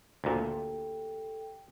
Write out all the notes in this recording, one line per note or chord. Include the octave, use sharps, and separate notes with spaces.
D2 A#2 G4 A4 G5